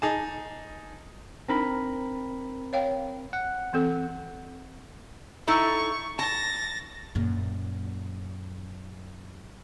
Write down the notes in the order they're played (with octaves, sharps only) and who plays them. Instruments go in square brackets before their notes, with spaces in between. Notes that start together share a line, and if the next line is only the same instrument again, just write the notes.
[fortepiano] D#4 G#4 A5
[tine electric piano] C4 A#4 B5 [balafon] D4 D#4
[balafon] C#5 F5 G5
[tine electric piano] F#5
[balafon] E3 C4 A4
[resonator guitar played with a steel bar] D#4 E4 A4 [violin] C#6
[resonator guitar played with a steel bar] A5 [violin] A6 A#6
[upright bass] F#2 A#2